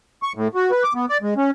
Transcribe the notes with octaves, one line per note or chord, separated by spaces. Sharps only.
C#6
A2
F#4
B4
D6
B3
D5
G#3
C#4